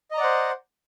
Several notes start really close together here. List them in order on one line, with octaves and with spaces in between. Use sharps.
D#5 A#5 D5 F#5 C5